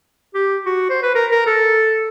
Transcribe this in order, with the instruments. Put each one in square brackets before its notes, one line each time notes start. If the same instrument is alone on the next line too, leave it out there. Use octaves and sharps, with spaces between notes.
[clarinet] G4
F#4
C5
B4
A#4
A#4
A4